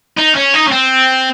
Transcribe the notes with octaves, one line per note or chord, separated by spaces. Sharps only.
D#4
C#4
D#4
C#4
C4